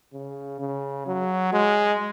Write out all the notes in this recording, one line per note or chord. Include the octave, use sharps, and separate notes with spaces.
C#3
C#3
F#3
G#3